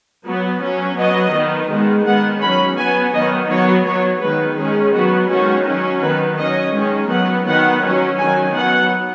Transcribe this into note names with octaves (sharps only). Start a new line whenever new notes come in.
F#3 B3
F#3 C#4
F#3 B3 D#5
D#3 B3
D#3 G#3 B3
D#3 G#3 B3 F#5
F#3 C#4 B5
F#3 B3 G#5
D#3 F#3 B3 D#5
F#3 B3 C#5
F#3 B3 C#5
D#3 G#3 B3 B4
D#3 G#3 C#4 G#4
F#3 B3 F#4
D#3 G#3 C#4 F#4
F#3 C#4
D#3 B3 B4
F#3 C#4 D#5
D#3 G#3 C#4
F#3 B3 F#5
D#3 B3 F#5
F#3 C#4
D#3 F#3 C#4 G#5
F#3 B3 F#5